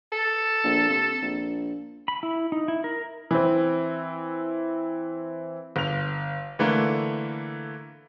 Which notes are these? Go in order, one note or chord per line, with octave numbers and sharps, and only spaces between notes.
A4
A#1
C3
A#1
B5
E4
D#4
E4
A#4
E3 C4
G1 F7
D3 E3 A3 A#3